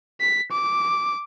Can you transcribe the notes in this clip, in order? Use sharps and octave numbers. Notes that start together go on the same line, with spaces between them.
B6
D6